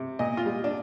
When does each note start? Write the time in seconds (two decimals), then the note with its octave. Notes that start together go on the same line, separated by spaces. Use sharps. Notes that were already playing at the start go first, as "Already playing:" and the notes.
Already playing: C3
0.19 A#2 D#5
0.37 F4
0.46 G3
0.64 D4